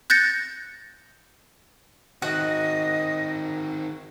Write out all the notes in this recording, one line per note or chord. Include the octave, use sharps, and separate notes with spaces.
F#6 G6 A6 A#6 C#7
D#3 C4 F#4 D#5